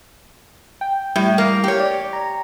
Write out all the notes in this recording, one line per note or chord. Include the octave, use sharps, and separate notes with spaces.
G5
A2 G3
A#3
G4 C#5
D5
A#5